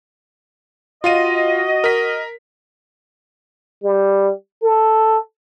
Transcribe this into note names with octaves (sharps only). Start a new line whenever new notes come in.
F4 F#4 D#5 F5 D#7
A#4 B6
G3
A4